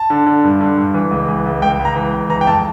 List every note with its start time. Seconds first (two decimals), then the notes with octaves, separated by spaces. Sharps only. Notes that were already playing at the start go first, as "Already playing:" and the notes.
Already playing: A5
0.10 D3
0.26 D3
0.44 G2
0.61 D3
0.77 G2
0.94 E3
1.11 C#2
1.28 E3
1.45 C#2
1.62 C#2 G5
1.79 C#2
1.85 A#5
1.96 E3
2.13 C#2
2.30 E3 A#5
2.41 G5
2.47 F2 A5